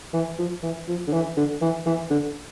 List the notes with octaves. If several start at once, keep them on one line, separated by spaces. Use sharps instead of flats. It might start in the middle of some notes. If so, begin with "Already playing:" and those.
E3
F3
E3
F3
D3
E3
D3
E3
E3
D3